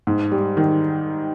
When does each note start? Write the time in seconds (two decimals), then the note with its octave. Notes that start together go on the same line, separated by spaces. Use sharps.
0.07 G#2
0.32 G3
0.57 D#3